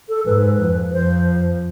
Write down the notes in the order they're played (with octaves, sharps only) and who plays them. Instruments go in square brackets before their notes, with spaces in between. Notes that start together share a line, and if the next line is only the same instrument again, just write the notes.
[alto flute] A4
[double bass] G#2 [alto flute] B4
[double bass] F2
[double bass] F2 [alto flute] C5